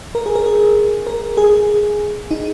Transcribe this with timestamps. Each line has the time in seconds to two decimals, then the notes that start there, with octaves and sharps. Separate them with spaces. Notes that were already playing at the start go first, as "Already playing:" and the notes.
0.15 A#4
0.26 G#4
0.36 A#4
0.46 G#4
1.07 A#4
1.37 G#4
2.31 D#4